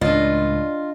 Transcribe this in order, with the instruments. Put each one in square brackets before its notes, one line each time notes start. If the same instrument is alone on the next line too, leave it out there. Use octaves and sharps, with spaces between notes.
[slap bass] C#2 A2 [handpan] D4 D#5 [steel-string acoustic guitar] F4